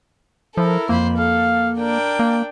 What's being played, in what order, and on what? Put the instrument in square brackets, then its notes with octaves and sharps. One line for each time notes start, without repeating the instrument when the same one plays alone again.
[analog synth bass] F3 [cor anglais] E4 [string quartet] A4 A#4
[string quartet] F2 C5 B5 [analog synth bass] A#3
[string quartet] A4 [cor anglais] F5
[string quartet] D4 G5 [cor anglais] A#4
[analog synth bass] A#3